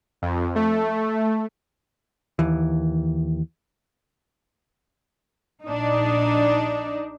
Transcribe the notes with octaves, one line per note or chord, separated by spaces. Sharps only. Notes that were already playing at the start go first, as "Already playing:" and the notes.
F2
A3
D#2 E3
A#1 D4 D#4